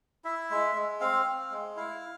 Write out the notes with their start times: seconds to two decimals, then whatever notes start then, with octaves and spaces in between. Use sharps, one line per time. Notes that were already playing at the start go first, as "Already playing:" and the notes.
0.25 E4 E5
0.50 G#3
0.75 G#3
1.01 C4 F5
1.26 C4
1.51 G#3
1.76 E4 F5